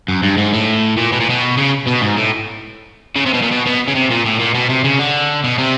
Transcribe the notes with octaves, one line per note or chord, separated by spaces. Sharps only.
F#2
G2
G#2
A2
A#2
B2
A#2
B2
C#3
B2
G#2
A2
C#3
C3
B2
A#2
B2
B2
C#3
C3
A#2
A2
A#2
B2
C3
C#3
D3
B2
C3